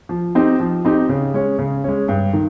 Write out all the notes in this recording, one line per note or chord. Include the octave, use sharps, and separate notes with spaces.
F3
C4 D#4 G4
F3
C4 D#4 G4
C#3
G#3 C#4
C#3
G#3 C#4
G2
D#3